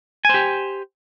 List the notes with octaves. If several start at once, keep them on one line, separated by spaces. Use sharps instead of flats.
G4 C5 G#5